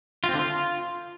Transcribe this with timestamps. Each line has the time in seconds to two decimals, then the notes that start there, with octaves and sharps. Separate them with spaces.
0.24 F4
0.29 C4
0.34 D3
0.39 F4